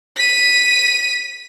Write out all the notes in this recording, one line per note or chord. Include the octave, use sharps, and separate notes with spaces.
B6 D#7